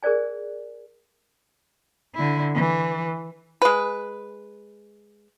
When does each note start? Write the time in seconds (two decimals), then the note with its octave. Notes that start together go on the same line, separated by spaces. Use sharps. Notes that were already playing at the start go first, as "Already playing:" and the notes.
0.03 G#4 A#4 C5 D5 G#5
2.15 D3 E4
2.55 E3
3.62 G#3 B4